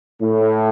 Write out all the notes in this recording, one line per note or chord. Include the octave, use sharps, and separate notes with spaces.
A2